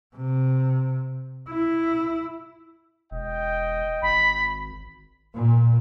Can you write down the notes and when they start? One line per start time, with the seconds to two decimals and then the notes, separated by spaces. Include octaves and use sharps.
0.16 C3
1.49 E4
3.11 E1 D#5 G5
4.02 G#1 B5
5.35 A#2